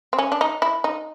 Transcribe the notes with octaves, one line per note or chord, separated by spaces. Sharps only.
C4
C#4
D4
D#4
E4
D#4